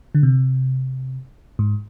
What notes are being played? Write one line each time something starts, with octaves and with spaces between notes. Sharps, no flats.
D3
C3
G#2